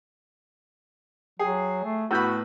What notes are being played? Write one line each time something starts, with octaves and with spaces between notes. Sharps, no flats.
F#3 G#4 G5 C7
A3
A2 B3 F#4 A#5 B5 E6 G6